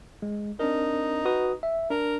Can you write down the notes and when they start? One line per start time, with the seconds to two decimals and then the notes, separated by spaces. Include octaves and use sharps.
0.22 G#3
0.59 C4 D4 D#4 A#4
1.25 F#4 B4 D#6
1.63 E5
1.90 D4 A#4